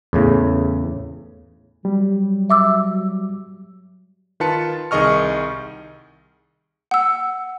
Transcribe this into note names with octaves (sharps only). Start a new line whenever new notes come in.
E2 A2 C#3 E3
F#3 G3
E5 D6 E6
D#3 F4 B4 A5 C#7
C2 D#3 G#4 D#5 C#6 F6
F#5 E6